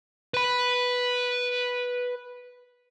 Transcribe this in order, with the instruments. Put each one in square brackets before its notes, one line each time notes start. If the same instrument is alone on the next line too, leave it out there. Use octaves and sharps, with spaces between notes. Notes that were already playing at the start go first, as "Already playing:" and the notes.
[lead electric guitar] B4 B5